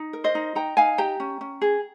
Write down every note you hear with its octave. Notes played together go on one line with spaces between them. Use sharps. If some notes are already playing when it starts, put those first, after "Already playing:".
Already playing: D#4
A#4
C5 D#5
D#4
D#4 G5 A#5
D#4 F5 G#5
G4 G5 A#5
C#4
C#4
G#4